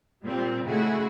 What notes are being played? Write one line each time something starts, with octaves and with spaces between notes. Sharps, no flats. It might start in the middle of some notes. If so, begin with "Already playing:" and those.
A#2 G3 C4 F4
C#3 G#3 A3 E4 F#4 G#4